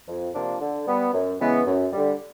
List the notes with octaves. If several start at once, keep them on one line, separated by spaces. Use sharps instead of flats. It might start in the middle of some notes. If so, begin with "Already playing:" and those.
F2
C3 F3 A#3 D4
D3
G3 B3
F#2
C#3 E3 G#3 B3
F#2
D3 G3